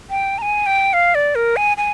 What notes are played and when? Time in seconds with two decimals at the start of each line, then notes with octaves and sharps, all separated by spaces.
0.10 G5
0.38 A#5
0.42 G#5
0.66 G5
0.93 F5
1.15 D5
1.35 A#4
1.56 G#5
1.77 G#5